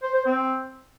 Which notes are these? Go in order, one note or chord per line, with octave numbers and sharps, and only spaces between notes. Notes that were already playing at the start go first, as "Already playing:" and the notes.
C5
C5
C4